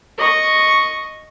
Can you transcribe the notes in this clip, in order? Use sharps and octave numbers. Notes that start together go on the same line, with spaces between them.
D#5 C#6